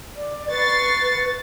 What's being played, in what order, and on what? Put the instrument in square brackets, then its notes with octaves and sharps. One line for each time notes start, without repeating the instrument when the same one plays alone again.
[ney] D5
[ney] B4 [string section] C#6 A6 C7